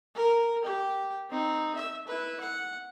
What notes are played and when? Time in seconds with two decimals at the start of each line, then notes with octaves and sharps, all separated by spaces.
0.15 A#4
0.62 G4 G5
1.30 C4 D#4
1.75 E5
2.07 E4 B4
2.40 F#5